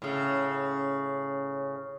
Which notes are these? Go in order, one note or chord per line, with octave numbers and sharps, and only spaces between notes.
A2 C#3